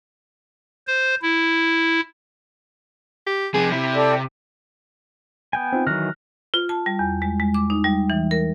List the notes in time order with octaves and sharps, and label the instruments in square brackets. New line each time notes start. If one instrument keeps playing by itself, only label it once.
[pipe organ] C5
E4
[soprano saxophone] G4
[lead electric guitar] C3 F3 [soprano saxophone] G#4
[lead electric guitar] C3 [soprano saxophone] E4
[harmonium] A4 D5
[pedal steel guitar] B3 G5 G#5
[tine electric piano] C4 D#4 F4
[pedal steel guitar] D#3 E3 F#3 [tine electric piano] F6 F#6 A#6
[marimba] F4
A5
G3
E2
G#3
G#3
D6
D#4
G3
E3
A#4